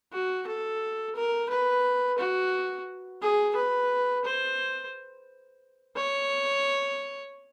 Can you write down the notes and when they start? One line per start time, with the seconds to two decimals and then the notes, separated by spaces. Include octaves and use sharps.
0.12 F#4
0.47 A4
1.16 A#4
1.49 B4
2.18 F#4
3.21 G#4
3.56 B4
4.25 C5
5.96 C#5